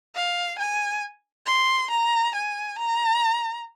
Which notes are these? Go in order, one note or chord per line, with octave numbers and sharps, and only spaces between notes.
F5
G#5
C6
A#5
G#5
A#5